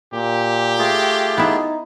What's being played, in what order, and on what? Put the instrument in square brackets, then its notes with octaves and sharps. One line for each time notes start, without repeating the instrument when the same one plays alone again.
[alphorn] A#2 [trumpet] G4
[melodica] A3 F4 G#4
[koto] B3 E4 [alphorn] D#4